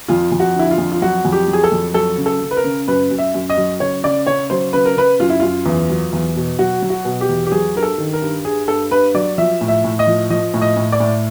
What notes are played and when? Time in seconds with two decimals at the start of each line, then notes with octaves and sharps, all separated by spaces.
0.08 F2 F4
0.32 F2
0.40 F#4
0.56 D3 E4
0.71 F4
0.78 F2
0.92 F4
1.02 F#3 F#4
1.25 F2
1.32 G4
1.48 F#3
1.53 G#4
1.64 A4
1.72 F2
1.94 F#3 A4
2.18 C#3
2.26 A4
2.41 C#3
2.51 B4
2.57 A#4
2.64 C#3
2.88 F#2 B4
3.11 F#2
3.18 E5
3.34 F#2
3.50 D#5
3.57 F#3
3.80 C#3 C#5
4.03 C#3 D5
4.27 C#3 C#5
4.50 F#3 C5
4.73 C#3 B4
4.86 A#4
4.96 C#3 B4
5.20 F#2 F4
5.30 E4
5.40 F#2 F4
5.66 E2
5.89 F#3
6.13 E2
6.36 B2
6.59 F#3 F#4
6.82 F#3
6.90 F#4
7.05 B2
7.21 G4
7.29 E2
7.46 G4
7.52 F#3 G#4
7.75 G2 A#4
7.83 A4
7.98 D#3
8.13 A#4
8.22 G2
8.45 G2 G#4
8.68 G2 A4
8.91 G2 B4
9.14 F#3 D5
9.38 F3 E5
9.61 A2
9.68 E5
9.84 A2
9.99 D#5
10.07 F3
10.30 F3 D#5
10.54 A2
10.61 D#5
10.77 A2
10.92 D5
11.00 A2